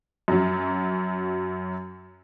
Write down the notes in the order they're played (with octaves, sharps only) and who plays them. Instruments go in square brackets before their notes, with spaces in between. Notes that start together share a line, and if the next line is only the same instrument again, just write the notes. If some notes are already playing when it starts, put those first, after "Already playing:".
[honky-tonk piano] F#2 F#3